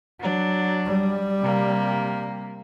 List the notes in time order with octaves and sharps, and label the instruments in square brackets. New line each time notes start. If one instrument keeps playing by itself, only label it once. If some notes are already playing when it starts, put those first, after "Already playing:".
[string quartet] F#3 D4
[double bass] G3
[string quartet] C3 A#3